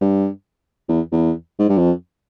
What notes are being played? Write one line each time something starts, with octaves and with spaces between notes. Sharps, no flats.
G2
E2
E2
G#2
G2
F2